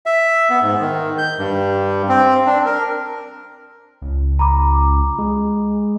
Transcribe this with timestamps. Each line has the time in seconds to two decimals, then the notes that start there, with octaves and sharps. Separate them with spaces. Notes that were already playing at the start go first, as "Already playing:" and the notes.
0.06 E5
0.50 B3
0.62 G#2
0.81 D#3
1.18 G6
1.38 G2
2.09 C4
2.46 D4
2.66 A#4
4.02 C#2
4.39 A#5 B5 D6
5.19 G#3